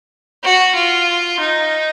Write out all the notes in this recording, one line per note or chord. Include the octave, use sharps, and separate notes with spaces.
F#4
F4
D#4